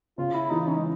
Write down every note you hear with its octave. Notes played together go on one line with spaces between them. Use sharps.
C#3 F4
E4
E3 D#4
C#4
G#3